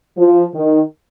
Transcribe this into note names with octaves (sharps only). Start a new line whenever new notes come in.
F3
D#3